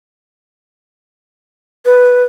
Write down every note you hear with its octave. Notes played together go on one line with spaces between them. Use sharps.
B4